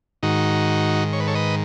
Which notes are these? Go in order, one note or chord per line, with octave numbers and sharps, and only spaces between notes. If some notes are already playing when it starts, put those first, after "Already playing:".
G#2 D#3 D#4 F#4
C#5
B4
A4 C#5
B4 D#5